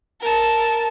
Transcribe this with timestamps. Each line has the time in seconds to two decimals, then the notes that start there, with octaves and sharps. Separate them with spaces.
0.21 A#4 A5